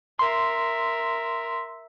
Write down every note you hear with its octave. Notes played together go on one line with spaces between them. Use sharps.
A#4 E5 C6